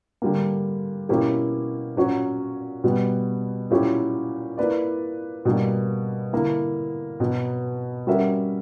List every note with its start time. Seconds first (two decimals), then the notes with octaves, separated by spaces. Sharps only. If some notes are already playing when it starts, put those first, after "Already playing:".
0.22 D3 G3 A#3
1.09 B2 A#3 C#4 E4 G4
1.96 A#2 F#3 C#4 F#4
2.84 B2 G3 B3
3.71 A#2 F#3 C#4 E4 G4
4.58 A#3 E4 B4 D5
5.45 B2 G3 A#3 D4
6.33 D3 A#3 E4
7.20 B2 F#3 B3
8.07 G3 C#4 F#4 A#4 E5